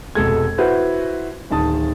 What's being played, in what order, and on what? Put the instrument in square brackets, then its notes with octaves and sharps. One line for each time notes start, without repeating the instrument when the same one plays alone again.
[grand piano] F1 B2 G#3 A4 G#6
E4 F#4 B4 C5
D1 D#3 A5 D#6